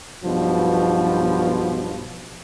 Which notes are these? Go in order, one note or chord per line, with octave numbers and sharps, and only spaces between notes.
B1 G2 B2 F3